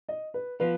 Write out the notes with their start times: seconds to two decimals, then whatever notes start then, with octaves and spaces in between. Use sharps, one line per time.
0.09 D#5
0.34 B4
0.60 F3 B3 F4 B4